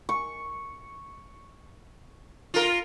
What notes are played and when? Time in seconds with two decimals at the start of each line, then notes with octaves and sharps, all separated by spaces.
0.09 C#6
2.54 F4 A#4